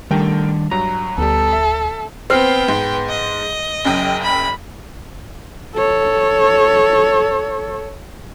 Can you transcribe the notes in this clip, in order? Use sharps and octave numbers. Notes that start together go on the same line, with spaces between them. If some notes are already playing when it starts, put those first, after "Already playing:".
D#3 G3 A3 D4 A#4 G5
G2 F#3 A#5
D2 G3 B3 A4
E5
B3 C4 G5 F6 C7
G#2
D#5
F#1 F#2 G5
B5
A4 C#5